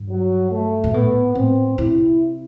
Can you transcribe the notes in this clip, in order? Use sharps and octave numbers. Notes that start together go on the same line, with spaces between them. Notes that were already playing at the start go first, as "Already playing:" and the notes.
Already playing: G2
F#3
A3
B2
A2 B3
A2 C4
C3 E4